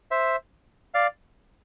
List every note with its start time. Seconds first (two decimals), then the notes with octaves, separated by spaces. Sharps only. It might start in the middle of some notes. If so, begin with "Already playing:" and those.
0.11 C5 E5
0.94 D5 F5